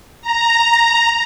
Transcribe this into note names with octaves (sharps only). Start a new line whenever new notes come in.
A#5